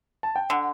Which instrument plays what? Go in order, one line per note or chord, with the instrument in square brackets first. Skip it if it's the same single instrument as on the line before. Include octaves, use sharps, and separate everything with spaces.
[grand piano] A5
G5
[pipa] D3 [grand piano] F#5